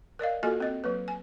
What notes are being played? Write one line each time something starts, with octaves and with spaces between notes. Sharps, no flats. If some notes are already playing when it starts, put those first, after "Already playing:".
A#4 D5 D#5 F5
A#3 F4 F#4 A4 D#5 G#5
C4 D#5
F#3 A#3 B4
G#5